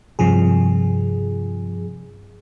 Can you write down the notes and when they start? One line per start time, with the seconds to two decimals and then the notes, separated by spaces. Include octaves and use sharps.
0.19 G2 C3 F3 G#4